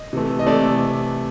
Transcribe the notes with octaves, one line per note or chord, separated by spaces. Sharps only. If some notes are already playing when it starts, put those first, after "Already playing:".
Already playing: D#5
C3 E3 A3
D#5
C3 E3 A3 D5